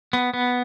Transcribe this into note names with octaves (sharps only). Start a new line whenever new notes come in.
B3
B3